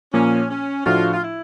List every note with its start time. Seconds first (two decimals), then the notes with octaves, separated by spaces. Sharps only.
0.14 A#2 F3 A#3 C#4
0.50 C#4
0.86 A2 F3 A3 D4 F4 F#4
1.13 F4
1.22 E4